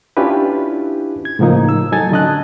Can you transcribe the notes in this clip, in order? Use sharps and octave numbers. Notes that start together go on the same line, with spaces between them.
C#4 D4 E4 F4 G4 B4
G#6
A2 C#3 F3 A#3 D#4
E6
F#3 D#4 A4 G#5 G#6 A6
D3 C#4 D#5 A5 F#6